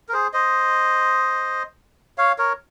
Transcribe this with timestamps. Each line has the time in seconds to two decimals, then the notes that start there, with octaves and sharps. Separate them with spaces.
0.09 A#4
0.13 G#4 C5
0.33 C5 D#5
2.18 C#5 F5
2.38 A#4 C#5